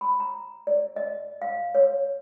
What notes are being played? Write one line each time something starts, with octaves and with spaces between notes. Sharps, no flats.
B5
A#5
D5
D#5
F5
C#5